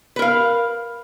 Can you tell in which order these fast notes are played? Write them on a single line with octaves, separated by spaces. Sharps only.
B4 A#4 F5